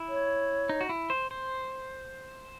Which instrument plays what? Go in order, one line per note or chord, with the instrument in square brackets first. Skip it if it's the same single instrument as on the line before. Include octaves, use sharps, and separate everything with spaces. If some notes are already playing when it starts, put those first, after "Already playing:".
Already playing: [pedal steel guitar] E4
[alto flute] C#5
[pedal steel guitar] D#4
F#4
E4
C5
C5